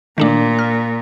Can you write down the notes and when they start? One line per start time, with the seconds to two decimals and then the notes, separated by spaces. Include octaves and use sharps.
0.18 A#2 D#3 A3 D4
0.59 F6